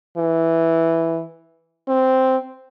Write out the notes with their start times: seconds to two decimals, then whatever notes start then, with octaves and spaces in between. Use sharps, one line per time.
0.18 E3
1.89 C4